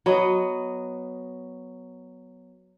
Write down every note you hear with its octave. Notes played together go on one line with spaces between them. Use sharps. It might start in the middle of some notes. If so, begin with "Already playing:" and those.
F#3 B3 D#5